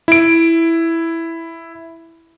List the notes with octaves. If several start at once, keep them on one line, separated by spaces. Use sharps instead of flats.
E4 D7